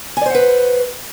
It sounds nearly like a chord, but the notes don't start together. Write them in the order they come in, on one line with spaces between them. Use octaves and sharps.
G#5 D5 C5 F#5 B4